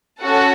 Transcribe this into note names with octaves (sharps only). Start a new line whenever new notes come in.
C#4 F#4 A4 F#5